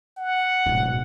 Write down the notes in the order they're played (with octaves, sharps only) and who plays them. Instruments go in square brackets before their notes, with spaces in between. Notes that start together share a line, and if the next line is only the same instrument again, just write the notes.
[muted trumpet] F#5
[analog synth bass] D1 [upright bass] G#2 B2